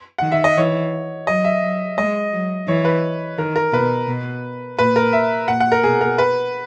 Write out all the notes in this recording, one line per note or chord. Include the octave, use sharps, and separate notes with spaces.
D#3 F#5
E5
D#5
E3 C#5
F#3 D#5
E5
F#3
G#3 D#5
F#3
E3 C#5
B4
D#3 A#4
A#4
B2 B4
B2
A#2 B4
A#4
E5
A#2 F#5
F#5
A#4
B2 G#4
A#4
B4